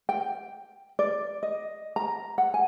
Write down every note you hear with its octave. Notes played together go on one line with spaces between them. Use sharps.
G5
D5
D#5
A#5
F#5
G#5